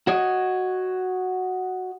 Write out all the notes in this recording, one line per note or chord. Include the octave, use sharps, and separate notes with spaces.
F#4 C#5 D#5